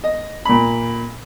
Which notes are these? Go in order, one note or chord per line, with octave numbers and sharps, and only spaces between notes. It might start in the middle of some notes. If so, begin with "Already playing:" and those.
D#5
A#2 B5